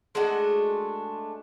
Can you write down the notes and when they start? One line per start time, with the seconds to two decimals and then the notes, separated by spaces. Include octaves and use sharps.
0.15 G#3 A3 D4 F#4